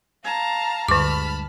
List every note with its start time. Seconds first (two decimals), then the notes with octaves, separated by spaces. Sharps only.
0.23 F5 A5 A#5
0.89 D2 G2 D3 G#3 A5 B5 D6 F6